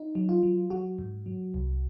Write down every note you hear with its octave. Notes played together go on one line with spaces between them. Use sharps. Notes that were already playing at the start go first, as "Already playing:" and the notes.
Already playing: D#4
F#3
F4
F#3
F#3 F#4
G#2
F#3
C2